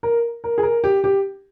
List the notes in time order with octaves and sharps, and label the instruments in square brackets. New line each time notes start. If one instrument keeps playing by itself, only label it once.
[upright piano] A#4
A#4
G#4
A#4
G4
G4